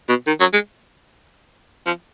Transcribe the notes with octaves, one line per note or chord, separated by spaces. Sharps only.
B2
D#3
F#3
G#3
F3